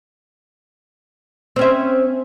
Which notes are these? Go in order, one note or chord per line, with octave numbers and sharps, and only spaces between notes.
C4 C#4 E5